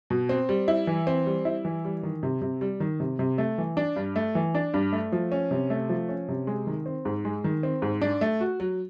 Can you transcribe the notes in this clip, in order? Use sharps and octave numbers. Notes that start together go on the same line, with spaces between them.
B2
C4
G3
E4
E3
C4
G3
E4
E3
G3
D#3
C3
C3
G3
D#3
C3
C3
A3
E3
D4
G2
A3
E3
D4
G2
A3
F3
C#4
C3
A3
F3
C#4
C3
G#3
D#3
C4
G#2
G#3
D#3
C4
G#2
D4
A3
F#4
F#3